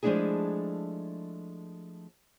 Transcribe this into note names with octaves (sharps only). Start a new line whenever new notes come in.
F3 G#3 A3 D4 E4 G#4